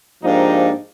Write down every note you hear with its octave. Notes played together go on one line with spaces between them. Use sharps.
G#2 F3 A#3 D4 D#4 G4